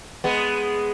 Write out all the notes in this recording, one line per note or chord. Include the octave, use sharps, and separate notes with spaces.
G#3 B3